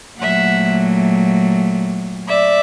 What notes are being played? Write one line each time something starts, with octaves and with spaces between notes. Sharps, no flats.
A#2 F#3 A3 E5 F#5
D5 E5